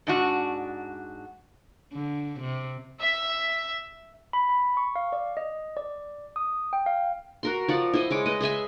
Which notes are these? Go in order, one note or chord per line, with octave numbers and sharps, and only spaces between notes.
G#2 D4 F#4
D3
C3
E5
B5
B5
C#6
F5
D5
D#5
D5
D#6
G5
F5
F#4 A#4 C6
F3 D5 F#5
E4 C5 D#5
G#3 C#5 D6
B4 D#5
G#4 D#5 E5 G#5